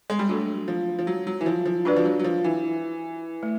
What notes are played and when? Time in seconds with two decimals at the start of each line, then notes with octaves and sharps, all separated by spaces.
0.10 G#3
0.19 G3
0.29 F#3 A3 D4 F#4 A4
0.68 F3
0.99 F3
1.07 F#3
1.27 F#3
1.41 E3
1.46 F3
1.66 F3
1.85 F#3 D4 F#4 B4 D5
1.96 F3
2.05 F#3
2.19 F#3
2.24 F3
2.44 E3
3.43 A3